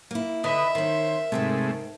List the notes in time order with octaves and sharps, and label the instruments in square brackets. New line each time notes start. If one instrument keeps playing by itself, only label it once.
[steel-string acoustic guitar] A#3 E4
[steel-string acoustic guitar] D3 [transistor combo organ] B4 D#5 [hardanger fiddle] E5 [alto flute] B5
[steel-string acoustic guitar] D#3 C#4 [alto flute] A#4 [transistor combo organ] C5
[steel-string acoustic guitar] G#2 G5 A5 [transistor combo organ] C3 G#3 A3